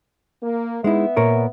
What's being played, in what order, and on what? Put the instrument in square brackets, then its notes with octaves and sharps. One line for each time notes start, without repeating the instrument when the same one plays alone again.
[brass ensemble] A#3
[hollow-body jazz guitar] G#3 D#4 E4 [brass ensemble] B3 E5
[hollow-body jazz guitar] A#2 A#4 C#5